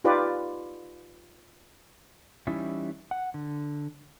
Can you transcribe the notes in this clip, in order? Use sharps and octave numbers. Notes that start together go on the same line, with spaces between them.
D#4 F4 G4 B4 D5
E3 G3 C#4 D#4 E4
F#5
D3